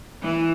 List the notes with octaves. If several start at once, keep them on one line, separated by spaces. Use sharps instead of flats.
E3